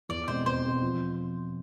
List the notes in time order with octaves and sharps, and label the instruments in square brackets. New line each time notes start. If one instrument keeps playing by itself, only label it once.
[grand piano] E2 [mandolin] D5
[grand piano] B2 G#3 C4 [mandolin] C5
[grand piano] E2 [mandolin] C5
[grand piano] B2 G#3 C4
F3